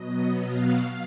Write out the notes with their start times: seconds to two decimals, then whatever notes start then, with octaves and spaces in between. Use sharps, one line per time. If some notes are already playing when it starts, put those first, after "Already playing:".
Already playing: B2 F#3 B3 D#5
0.45 F5